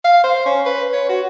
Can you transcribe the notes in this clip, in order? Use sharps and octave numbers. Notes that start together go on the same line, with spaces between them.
F5
C5
C#4
B4
C#5
F#4